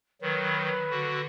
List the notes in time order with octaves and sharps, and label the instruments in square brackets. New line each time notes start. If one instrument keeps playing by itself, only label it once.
[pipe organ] D#3 F#3 [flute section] B4
[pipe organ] D3 F#4